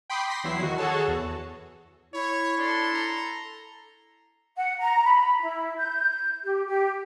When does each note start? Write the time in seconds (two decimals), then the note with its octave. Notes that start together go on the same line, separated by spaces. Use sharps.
0.10 G5 B5 C6 D6 D#6
0.28 C6 A#6 B6
0.44 E2 F#3 E4 C7
0.62 D#3 F#4
0.78 F#4 G#4 A4 C#5 A5
1.08 E2
2.13 E4 C#5
2.57 D4 A4 C6
2.94 A#5
4.56 F#5
4.80 A#5
5.04 B5
5.40 E4
5.78 G6
6.44 G4
6.66 G4